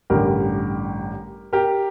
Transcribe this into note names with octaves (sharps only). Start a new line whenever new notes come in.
A1 G2 D3 G4 A#4
G4 A#4